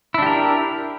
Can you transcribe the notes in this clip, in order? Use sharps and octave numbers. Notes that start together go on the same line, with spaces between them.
D4 E4 G4 A#4